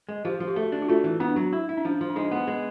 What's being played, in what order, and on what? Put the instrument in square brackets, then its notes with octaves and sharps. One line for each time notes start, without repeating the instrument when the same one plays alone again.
[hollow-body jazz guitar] G#3
[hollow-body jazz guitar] F3 [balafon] G4
[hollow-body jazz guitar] F3
[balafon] G4
[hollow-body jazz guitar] A3 [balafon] F#4
[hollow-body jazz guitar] D4
[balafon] F#4
[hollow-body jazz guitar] A3 [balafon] F4
[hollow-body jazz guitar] E3
[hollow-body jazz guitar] B3 [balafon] D4
[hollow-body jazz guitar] F#3
E4
E4
[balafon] D4
[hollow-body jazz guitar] F3 [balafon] C#4
[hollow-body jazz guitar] F3
[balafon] D4
[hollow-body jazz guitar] G#3 [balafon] D#4
[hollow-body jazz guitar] B3
G#3